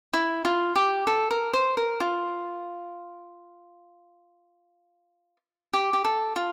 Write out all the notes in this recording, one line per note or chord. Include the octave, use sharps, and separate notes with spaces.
E4
F4
G4
A4
A#4
C5
A#4
F4
G4
G4
A4
F4